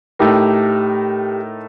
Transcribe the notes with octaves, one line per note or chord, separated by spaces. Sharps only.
A2 A3 D#4 G4 A#4